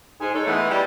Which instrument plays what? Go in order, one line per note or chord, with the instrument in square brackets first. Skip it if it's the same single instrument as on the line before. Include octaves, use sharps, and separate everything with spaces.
[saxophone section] G#2 G#4
G#3 D#4 A4 C#5
E3 G#3 A3 B3
G3